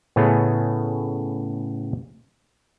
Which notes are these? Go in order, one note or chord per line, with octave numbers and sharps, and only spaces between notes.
A2 C#3 A3 B3 C#4 G#4